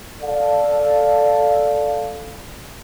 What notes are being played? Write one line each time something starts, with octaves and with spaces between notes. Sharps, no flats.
A4 D5 F5